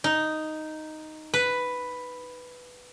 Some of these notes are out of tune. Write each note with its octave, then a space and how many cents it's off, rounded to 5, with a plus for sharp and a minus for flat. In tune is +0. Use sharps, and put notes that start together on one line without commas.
D#4 +0
B4 +5